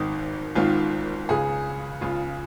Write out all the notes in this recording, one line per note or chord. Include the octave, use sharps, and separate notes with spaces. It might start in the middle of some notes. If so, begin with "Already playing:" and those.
Already playing: G#1 G#2 D#3 D#4
G#1 G#2 D#3 F4
C#2 C#3 G#4
C#2 C#3 F4